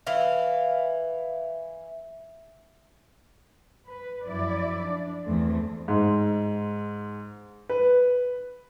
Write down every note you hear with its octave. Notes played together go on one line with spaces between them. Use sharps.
E3 F5
B4
F#2 F3 E4 D5
D4
E2 A3 C4
G#2
B4